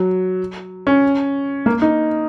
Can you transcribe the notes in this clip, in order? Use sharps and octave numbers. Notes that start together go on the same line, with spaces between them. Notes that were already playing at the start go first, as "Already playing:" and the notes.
Already playing: F#3
C#4
A#3
D#4